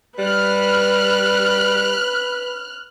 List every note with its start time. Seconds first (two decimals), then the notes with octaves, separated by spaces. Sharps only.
0.19 G3 B4 F6 F#6